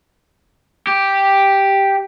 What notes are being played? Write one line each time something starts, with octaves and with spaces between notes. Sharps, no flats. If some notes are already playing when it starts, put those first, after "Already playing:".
G4